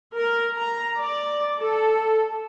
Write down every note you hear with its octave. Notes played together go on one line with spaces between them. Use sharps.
A#4
A#5
D5
A4